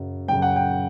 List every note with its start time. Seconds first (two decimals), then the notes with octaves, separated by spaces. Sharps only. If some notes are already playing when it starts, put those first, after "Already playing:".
Already playing: F#2 C#3 F#3
0.28 F#2 C#3 F#3 G5
0.42 F#5
0.56 G5